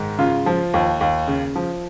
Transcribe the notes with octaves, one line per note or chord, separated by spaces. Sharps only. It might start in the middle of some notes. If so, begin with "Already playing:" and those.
Already playing: G#2 D#3
C#3 F4
F3
D#2
D#2
C#3
F3